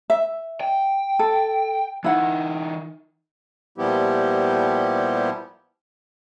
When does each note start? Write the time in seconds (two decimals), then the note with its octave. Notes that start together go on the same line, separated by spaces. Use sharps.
0.10 E5
0.61 G5
1.19 A4
2.04 E3 D#4 E4 F#5
3.78 A#2 F3 G3 B3 E4 G4